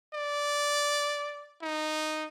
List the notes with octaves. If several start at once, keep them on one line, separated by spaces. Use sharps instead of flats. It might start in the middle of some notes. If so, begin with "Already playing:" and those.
D5
D#4